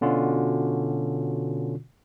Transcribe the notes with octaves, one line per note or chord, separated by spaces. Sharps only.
B2 D3 C#4 F4 F#4